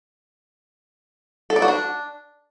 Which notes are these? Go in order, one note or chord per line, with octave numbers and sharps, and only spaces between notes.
A4
D5
F#4
D4